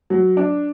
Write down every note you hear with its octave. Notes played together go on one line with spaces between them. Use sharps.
F#3
D4